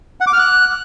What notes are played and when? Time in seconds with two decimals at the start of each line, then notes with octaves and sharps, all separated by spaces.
0.21 F#5
0.27 D6
0.33 F6
0.39 F#6